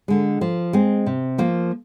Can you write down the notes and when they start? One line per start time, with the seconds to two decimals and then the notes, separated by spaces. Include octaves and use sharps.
0.08 D3 G#3
0.41 F3
0.73 G#3 C4
1.07 C3
1.38 F3 A#3